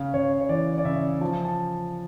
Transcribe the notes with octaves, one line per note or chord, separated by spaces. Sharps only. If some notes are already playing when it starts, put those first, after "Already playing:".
Already playing: C#3 F5
C#3 C#5
C#5
E3 D5
D5
C#3 E5
F3 A5
A5